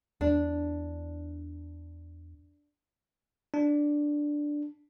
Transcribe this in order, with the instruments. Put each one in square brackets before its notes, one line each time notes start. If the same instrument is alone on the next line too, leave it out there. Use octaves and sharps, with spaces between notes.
[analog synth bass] E2 [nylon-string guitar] D4
[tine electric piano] D4